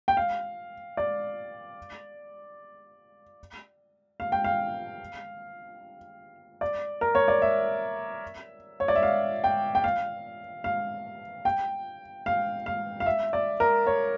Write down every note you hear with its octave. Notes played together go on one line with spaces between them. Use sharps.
G5
F5
D5
F5
G5
F5
D5
A#4
C#5
D5
E5
C#5
D5
E5
F5
G5
G5
F5
F5
G5
F5
F5
F5
E5
D5
A#4
C#5